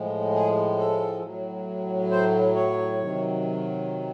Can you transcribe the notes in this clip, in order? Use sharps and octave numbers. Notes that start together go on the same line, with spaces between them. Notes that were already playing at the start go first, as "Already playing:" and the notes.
Already playing: A2 F3 G#3
G#4
A4
A2 F#3
C5
C#5
C3 D#3 F#3